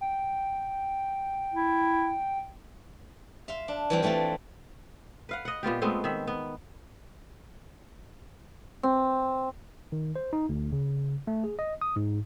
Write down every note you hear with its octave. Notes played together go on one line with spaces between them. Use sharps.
G5
E4
E5 F5 C6
D4
E3 G3 C4
E3 A3 C4 E4 F4
B4 F5 F#5
D#5 F#5
A#2 B3 F4 G4
G#3 A3 B3 C4
D#3 E5
B3
C4
D#3
C5
D#4
D2
C#3
A3
G#4
D#5
D#6
G#2